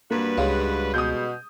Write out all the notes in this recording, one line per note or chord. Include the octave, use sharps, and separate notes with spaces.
G2 A#3 F#4 B4
C#2 G3 G#3 C#5 F5
B2 D#6 G6